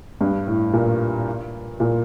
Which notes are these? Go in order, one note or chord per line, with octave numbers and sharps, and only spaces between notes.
G2
A2
A#2
A#2